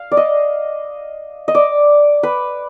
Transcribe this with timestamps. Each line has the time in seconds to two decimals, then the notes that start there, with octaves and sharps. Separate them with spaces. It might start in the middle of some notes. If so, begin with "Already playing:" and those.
Already playing: F5
0.12 D5
0.17 D#5
1.48 D#5
1.55 D5
2.23 B4